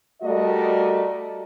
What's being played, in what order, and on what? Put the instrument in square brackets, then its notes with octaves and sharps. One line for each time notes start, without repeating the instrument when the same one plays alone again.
[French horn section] G3 A3 F#4 A#4 D5 D#5